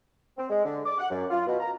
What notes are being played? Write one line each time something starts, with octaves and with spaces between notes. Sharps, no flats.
C4
G#3
D3
D6
F#5
F#2
F4
B2
A#5